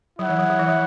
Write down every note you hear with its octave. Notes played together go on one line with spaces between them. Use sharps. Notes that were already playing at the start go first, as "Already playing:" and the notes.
F#3 E4 C#5 F#5
E3
F#3
F#3
E3
F#3